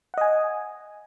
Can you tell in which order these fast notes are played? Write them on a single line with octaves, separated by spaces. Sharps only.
F#5 D#5 G#5